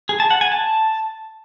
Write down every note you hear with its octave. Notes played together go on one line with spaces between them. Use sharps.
G#4
A5
F#5
G#5
A5